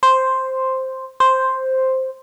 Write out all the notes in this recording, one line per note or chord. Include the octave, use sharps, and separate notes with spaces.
C5
C5